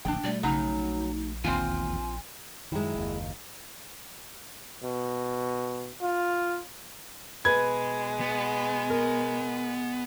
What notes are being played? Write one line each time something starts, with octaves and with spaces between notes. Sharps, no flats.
D1 A#1 D4 G5
B2 G3 A3 D5
A#1 C#3 F#3 D#4
E1 D#2 C4 F4 G#5
F#2 D#3 G#3 E4
F#1 D#2
B2
F4
B2 G#3 B4 G#6
B3
A#4